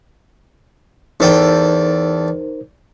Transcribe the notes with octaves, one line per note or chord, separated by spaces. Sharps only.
E2 D#4 A4 A#4 C5 G5